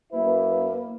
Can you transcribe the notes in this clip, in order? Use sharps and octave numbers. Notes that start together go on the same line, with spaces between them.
F#2 A#3 E4 B4